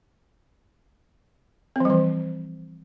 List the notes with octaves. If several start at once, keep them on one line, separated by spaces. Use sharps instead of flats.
E3 F3 G3 C4